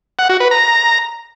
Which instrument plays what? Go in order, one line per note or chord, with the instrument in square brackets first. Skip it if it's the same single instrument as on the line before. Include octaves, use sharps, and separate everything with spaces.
[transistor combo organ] F#5
F#4
B4
A#5